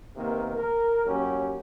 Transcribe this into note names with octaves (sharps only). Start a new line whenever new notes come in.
C3 D#3 A#3 B3
A#4
D#2 F#3 C#4 G4